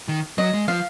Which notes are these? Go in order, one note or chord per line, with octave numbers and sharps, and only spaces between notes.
D#3
F#3 D#5
G#3
F3 F5